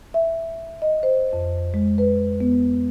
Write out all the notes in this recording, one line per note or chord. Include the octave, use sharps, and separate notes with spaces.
E5
D#5
C5
F2
G#3
B4
B3